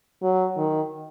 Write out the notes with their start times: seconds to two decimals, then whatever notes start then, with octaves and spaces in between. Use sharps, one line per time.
0.22 F#3
0.57 D#3